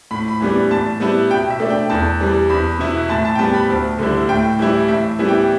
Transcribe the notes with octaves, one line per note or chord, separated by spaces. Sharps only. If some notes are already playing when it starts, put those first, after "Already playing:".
A2 B5
B5
E3 G3 B3 D4
A2 A5
G3 B3 E4
B2 G5
E5
A3 D4
G5
E2 A5
E3 G3
E2 B5
B2 B3 E4
A2 A5
A5
G5
G3 B3 A5
B5
D2
D3 G3 E4
A2 G5
E3 G3 E4
A2 E5
E3 G3 B3 E4
G5